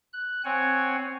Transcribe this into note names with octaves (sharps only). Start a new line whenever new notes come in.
F#6
C4 C#5 F#5 G#5